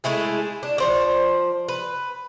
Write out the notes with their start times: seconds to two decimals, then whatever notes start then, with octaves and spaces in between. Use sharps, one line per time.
0.04 G#3 A3 E4 G#4
0.63 D4
0.78 F3 C5 D5
1.68 B4